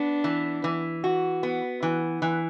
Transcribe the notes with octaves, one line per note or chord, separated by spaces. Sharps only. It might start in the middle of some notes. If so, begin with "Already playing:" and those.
Already playing: B3 D4
E3
E3
F#4
B3
E3
E3